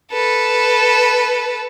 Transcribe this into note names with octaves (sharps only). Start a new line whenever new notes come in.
A4 B4